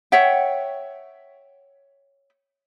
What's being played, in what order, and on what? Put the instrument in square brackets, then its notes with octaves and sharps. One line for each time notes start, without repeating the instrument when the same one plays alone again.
[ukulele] C#5 E5 F#5 G5